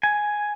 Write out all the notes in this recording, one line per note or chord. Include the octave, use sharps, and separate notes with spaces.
G#5